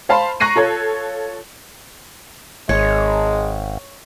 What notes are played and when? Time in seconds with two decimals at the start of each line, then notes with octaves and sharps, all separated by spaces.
0.09 C5 F5 A5 B5 C6
0.40 A#5 C#6 F#6 A#6 C7 D#7
0.56 F4 A4 C#5
2.69 G#1 G#3 C#5